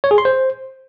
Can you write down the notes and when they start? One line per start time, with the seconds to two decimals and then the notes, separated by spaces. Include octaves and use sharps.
0.04 C#5
0.11 G#4
0.18 C6
0.25 C5